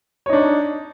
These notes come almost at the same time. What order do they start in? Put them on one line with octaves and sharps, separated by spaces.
C#5 D#4 D4